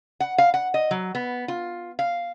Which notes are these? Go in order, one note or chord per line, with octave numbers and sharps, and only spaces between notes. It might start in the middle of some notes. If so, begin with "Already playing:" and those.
F#5
F5
F#5
D#5
F#3
B3
F4
F5